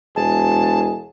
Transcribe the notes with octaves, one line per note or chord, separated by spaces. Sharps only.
E1 G#4 A5